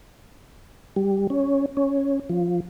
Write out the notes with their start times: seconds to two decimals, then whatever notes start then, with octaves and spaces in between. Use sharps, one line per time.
0.96 G3
1.30 C#4
1.77 C#4
2.29 F3